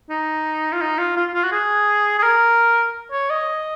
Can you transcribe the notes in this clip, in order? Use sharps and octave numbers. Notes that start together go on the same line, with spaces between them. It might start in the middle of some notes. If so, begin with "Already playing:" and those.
D#4
F4
D#4
F4
F4
F4
F#4
G#4
G#4
A#4
C#5
D#5